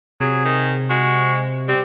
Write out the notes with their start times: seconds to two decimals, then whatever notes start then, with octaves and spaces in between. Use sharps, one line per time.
0.20 C3 F#3 G#4
0.45 D#3
0.90 G#3 F#4
1.68 G3 C4